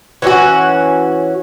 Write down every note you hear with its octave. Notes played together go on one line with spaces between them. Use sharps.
E3 C#4 D#4 F#4